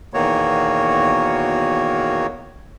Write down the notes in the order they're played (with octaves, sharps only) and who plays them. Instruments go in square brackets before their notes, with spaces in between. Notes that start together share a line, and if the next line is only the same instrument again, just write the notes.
[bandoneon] E2 B2 D#3 A#3 F#4 C#5